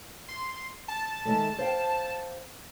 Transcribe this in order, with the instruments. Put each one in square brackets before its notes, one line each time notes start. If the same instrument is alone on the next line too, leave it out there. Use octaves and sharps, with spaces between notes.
[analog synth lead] C6
A5
[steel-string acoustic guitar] D#3 G#3 A3
C5 F5 G5